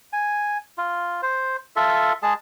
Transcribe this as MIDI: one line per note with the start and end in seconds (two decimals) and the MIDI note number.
0.13 0.58 80
0.78 1.21 65
1.22 1.56 72
1.76 2.13 65
1.76 2.13 69
1.76 2.13 76
2.23 2.34 56
2.23 2.34 68
2.23 2.34 81